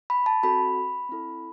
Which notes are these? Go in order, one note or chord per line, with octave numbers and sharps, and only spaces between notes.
B5
A5
C4 F#4 A4 B5
C4 E4 A4